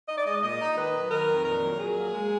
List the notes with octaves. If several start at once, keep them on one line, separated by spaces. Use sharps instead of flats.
D#4 D#5
D5
G#3 D#5
A#2 D#5
D#4
D#3 B4
F#3
D#3 A#4
F2
A#2 A#4
F#3
F#3 G#4
A#3
G#3